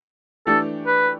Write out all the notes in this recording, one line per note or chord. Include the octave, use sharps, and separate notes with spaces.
E3 A3 D4 G4 A4
B4